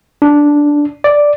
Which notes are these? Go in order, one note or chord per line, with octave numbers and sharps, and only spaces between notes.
D4
D5